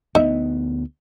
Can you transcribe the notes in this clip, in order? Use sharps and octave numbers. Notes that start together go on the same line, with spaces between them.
D2 A#3 B3 D#4 E5